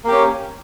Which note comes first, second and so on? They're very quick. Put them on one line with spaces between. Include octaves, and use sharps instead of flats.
A#3 G4 C#4